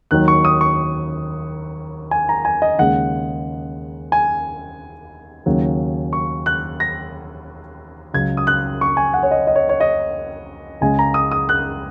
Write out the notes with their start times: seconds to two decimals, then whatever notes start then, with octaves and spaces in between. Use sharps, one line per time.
0.11 D#2 D#3 F#3 F#6
0.28 C#6
0.45 D#6
0.61 C#6
2.11 G#5
2.29 A#5
2.45 G#5
2.62 D#5
2.79 D#2 C#3 G#3 F#5
4.12 G#5
5.46 D#2 C#3 F#3
6.13 C#6
6.46 F#6
6.80 A#6
8.14 C#2 C#3 F#3 G#6
8.37 D#6
8.47 F#6
8.81 C#6
8.97 G#5
9.14 F#5
9.23 C#5
9.31 D#5
9.47 D#5
9.56 C#5
9.69 C#5
9.80 D#5
10.81 C#2 C#3 G#3 G#5
10.99 A#5
11.14 D#6
11.31 D#6
11.49 F#6